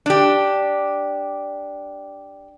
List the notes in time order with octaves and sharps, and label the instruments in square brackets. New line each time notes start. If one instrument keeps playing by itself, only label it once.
[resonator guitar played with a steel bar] D4 G4